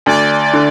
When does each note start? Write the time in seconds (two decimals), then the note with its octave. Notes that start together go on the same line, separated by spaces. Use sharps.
0.06 D2 D5
0.53 D3